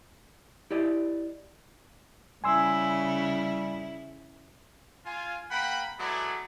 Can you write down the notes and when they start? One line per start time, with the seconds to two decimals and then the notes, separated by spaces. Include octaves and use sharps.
0.71 E4 G4 D5 D#5
2.44 C#3 G3 E4 G#5 C6 E6
5.06 F4 G#5
5.51 A#3 F#5 G5 B5
5.99 F#3 G#3 A3 B3 E4 D5